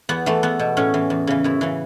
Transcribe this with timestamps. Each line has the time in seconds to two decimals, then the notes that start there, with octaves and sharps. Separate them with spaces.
0.09 E2 B3
0.26 E3 A3
0.43 E2 B3
0.59 B2
0.77 A2 C#4
0.94 E3
1.10 E2
1.27 C#3 E3
1.44 F#2 E4
1.61 C#3 E3